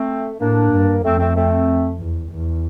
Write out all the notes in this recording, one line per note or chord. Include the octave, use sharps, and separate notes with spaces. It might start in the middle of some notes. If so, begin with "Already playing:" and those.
Already playing: A3 C4
A2 A#3 D4
G2
F2 A3 C4
A3 C4
A3 C4
E2
E2